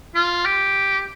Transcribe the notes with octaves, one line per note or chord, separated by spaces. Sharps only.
F4
G4